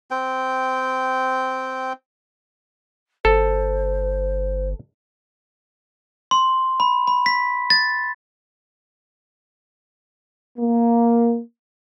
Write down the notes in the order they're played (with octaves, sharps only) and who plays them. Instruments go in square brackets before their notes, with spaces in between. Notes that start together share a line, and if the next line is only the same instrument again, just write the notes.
[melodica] C4 G5
[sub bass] G1 [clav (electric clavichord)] A4 [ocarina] C5
[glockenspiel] C6
B5
B5
B6
A6
[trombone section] A#3